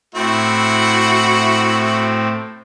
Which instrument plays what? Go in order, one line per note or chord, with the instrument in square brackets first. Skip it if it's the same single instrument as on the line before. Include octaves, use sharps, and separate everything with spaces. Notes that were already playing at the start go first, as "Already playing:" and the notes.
[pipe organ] A2 C4 [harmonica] E4 F#4